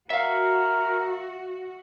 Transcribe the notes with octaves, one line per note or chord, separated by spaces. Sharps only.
F#4 A#4 E5 F5